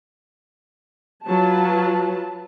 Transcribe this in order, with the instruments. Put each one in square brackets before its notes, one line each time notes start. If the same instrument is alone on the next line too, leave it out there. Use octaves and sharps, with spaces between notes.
[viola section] F#3 F4 B4 A5